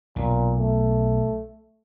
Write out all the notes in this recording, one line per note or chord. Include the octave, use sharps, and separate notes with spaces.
B1 A#2
A3